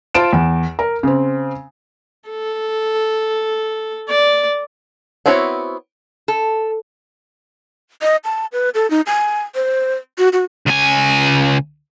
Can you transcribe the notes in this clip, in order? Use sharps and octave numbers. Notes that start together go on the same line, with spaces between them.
F4 C5 A5 D7 E7
E2
A#4
C#3 C4
A4
D5
B3 C4 E4 F#4 C#5
A4
D#5
A5
B4
A4
D#4
G#5
C5
F#4
F#4
C#2 G#5